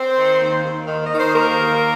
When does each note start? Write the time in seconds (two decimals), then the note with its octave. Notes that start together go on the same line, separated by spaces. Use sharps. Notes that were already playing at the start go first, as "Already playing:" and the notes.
Already playing: C4 C5
0.16 D#3
0.39 D#2
0.63 D#2
0.87 D#3
1.06 D#3 D#5
1.20 C5
1.33 D#2 A#3 A#4
1.57 D#2